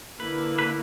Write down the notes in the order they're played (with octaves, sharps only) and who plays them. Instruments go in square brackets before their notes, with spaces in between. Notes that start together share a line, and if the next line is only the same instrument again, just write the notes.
[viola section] D3 A#3 E4 [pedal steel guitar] B4
[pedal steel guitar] B4